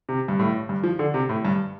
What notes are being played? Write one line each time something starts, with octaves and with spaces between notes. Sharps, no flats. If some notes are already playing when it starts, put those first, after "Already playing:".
C3
G2
A2
G2
F3
D3
C3
A2
G2